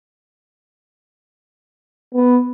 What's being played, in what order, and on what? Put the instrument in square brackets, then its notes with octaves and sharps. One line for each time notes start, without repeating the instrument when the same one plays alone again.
[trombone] B3